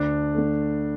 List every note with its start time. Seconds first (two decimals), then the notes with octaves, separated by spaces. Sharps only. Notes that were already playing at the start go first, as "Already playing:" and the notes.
Already playing: D2 D4
0.34 D3 A3